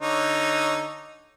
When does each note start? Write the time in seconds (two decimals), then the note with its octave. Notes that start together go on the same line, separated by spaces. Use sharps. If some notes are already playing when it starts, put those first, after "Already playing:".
0.01 D3 D#4 C#5